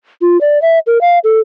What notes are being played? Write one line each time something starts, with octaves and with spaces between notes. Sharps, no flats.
F4
D5
E5
A#4
F5
A4